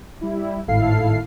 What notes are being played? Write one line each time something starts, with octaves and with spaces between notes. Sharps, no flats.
G3 E4
G#1 A2 E4 A4 F5 C7